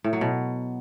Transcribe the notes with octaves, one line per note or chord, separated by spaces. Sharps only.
A2
F#3
B2